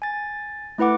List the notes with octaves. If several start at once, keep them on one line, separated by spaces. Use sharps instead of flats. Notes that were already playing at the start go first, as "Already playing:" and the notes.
G#5 A6
A3 E4 B4 F#5 D6